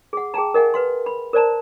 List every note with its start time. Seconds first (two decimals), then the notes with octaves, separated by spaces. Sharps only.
0.13 G#4 F#5
0.34 G#4 G5 A5 A#5
0.54 A#4 D#5 F#5 G#5
0.74 B4 F5 C6
1.06 B5
1.33 A#4 C5 D5 A5 A#5